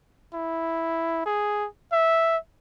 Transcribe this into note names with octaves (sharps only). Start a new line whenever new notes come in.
E4
G#4
E5